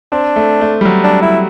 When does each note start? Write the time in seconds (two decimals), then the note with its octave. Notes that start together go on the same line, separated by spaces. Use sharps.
0.12 C4 D4
0.36 A3
0.61 A3
0.81 G3
0.85 F#3
1.04 D4
1.22 E4